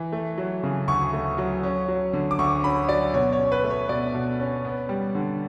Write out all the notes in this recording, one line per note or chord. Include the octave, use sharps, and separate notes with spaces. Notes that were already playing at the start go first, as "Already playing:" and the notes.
Already playing: E3
A3
F#3
C#3
D2 C#6
A3
F#3
C#4
F#3
D3
D6
D2 C#6
C#4 B5
F#3 D5
B2 C#5
C#5
C#4
B4
A3
C#5
B2 D5
B2
C#4
B3
G3
D3